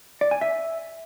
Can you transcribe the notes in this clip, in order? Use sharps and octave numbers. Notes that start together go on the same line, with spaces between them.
D5
G#5
E5